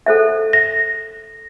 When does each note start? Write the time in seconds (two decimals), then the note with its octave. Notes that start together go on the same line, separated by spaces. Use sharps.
0.06 A4 C5 E5
0.53 A#6